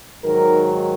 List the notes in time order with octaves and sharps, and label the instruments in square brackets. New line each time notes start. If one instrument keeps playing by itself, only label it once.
[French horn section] G#2 D#3 F#3 A#4